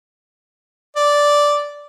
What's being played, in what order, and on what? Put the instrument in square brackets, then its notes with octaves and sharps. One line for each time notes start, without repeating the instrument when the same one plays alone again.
[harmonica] D5